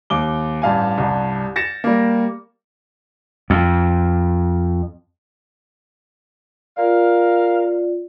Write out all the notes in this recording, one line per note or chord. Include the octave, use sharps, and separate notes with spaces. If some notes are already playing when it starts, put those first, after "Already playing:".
D#2 D6 G7
A1 G2 F5 G#5
C2 G2
A6 A#6 C#7 E7
G3 A#3
F2
F4 A#4 D5 F5